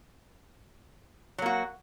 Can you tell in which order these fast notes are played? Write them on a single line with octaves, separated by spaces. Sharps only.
F#3 A#3 F#4